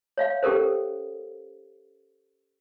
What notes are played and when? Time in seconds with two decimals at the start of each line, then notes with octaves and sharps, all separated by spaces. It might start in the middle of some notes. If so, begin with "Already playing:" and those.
0.17 C#5 E5 F5
0.43 C#4 G4 A4 A#4 C5